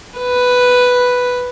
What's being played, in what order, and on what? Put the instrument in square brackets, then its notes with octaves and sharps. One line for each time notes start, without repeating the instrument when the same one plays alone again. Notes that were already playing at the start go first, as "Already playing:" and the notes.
[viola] B4